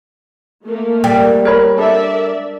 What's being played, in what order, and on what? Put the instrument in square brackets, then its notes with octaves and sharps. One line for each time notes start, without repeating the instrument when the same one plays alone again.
[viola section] A3 A#3
[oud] G3 [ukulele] G5
[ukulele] A#4 C#5 B5
[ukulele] D4 A4 [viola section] A#4 D5 E5